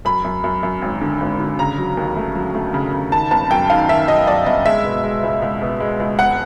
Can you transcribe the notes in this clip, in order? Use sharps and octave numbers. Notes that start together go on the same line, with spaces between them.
F#2 B5
F#2
F#2
F#2
G#1
D3
G#1
D3
C#3 A#5
F#3
D#2
A3
F#3
A3
C#3
C#3
D#3 A5
G1 A5
F#2 G5
D#3 F5
D#3 E5
F#2 D#5
F#2 D5
G1 D#5
G#3 E5
B2
G#3
C#2
C#2
B2
G#3
C#2
E1 F#5